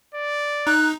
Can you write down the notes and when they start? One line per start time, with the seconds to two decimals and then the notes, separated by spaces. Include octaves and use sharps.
0.14 D5
0.67 D#4 F#6